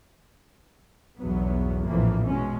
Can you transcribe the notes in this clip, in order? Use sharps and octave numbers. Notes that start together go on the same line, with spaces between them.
B1 E2 G2 F#3 B3
A#1 F2 A2 E3 F3 A#3
B2 G#3 C#4